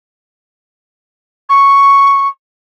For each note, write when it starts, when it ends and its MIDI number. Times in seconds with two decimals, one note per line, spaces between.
1.49 2.28 85